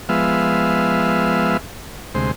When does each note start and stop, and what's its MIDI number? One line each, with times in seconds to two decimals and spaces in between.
0.09 1.57 53
0.09 1.57 56
0.09 1.57 59
0.09 1.57 76
0.09 1.57 77
2.15 2.31 38
2.15 2.31 48
2.15 2.31 56
2.15 2.31 72